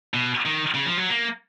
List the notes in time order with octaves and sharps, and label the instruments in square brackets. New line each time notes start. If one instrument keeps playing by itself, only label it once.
[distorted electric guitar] B2
D#3
C#3
F3
F#3
A#3